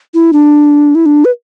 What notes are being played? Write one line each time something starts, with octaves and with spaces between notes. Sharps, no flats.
E4
D4
E4
D4
B4